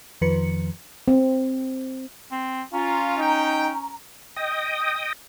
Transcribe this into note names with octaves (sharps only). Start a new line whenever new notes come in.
F2 D#3 F3 B4 C#7
C4
C4
C#4 F4 A#5
D#4 G5
D#5 G5 D#6